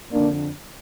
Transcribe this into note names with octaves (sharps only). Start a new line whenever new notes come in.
F2 D3 A#3 D4